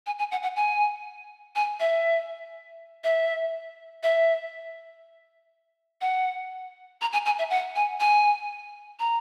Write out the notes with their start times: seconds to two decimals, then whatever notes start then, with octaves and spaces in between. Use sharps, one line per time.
0.06 G#5
0.19 G#5
0.32 F#5
0.43 F#5
0.56 G#5
1.55 G#5
1.80 E5
3.04 E5
4.03 E5
6.01 F#5
7.01 A#5
7.13 G#5
7.26 G#5
7.39 E5
7.50 F#5
7.76 G#5
8.00 G#5
9.00 A#5